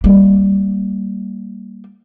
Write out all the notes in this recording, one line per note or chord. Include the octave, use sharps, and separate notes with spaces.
G3 A#3